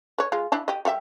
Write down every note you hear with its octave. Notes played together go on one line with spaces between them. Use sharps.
B4 C#5
G#3 F4
D4 E4 A5
G4 D#5
G3 G4 E5